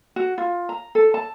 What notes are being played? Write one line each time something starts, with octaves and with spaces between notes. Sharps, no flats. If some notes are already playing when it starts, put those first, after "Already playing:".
F#4
F4
A#5
A4
A5